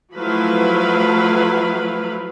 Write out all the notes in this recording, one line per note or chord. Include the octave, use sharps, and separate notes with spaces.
F3 F#3 A3 E4 B4 F5